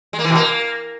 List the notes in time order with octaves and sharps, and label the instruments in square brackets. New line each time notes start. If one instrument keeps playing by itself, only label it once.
[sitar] G#3
A#3
E3
B2
A#3